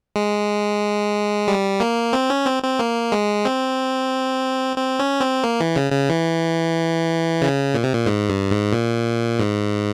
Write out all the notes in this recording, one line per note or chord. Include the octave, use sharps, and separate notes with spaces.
G#3
G3
A#3
C4
C#4
C4
C4
A#3
G#3
C4
C4
C#4
C4
A#3
E3
C#3
C#3
E3
C#3
A#2
C3
A#2
G#2
G2
G#2
A#2
G#2